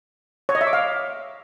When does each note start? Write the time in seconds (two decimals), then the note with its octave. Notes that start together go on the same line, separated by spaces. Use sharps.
0.49 C#5
0.55 D#5
0.61 E5
0.67 D6
0.73 F5